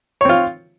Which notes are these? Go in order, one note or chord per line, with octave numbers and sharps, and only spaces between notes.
C4 F4 C#5